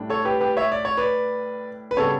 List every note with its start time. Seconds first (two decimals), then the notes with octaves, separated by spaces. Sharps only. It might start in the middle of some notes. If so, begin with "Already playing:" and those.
Already playing: A2 G3 D4
0.10 A4 C#5
0.25 G4 B4
0.40 G4 B4
0.57 C#5 E5
0.72 D5
0.85 C#5
0.97 B4 D5
1.91 B4
1.97 C#3 G3 B3 D4 A4 C#5